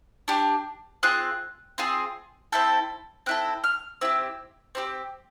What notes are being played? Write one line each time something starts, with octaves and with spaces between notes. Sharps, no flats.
D4 G4
C4 F4 G#4 F#6
C4 F4 G#4
C4 E4 A4 G6
C4 E4 A4 F#6
F6
C4 E4 G4 E6
C4 E4 G4